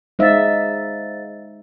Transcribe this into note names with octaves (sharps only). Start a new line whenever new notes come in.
G#3 D#4 C5 E5 F5 A6